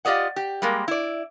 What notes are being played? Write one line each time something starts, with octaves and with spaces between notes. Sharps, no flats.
F4 G4 D5 D#5 F#5
G4
G3 G#3 A#3
E4 D5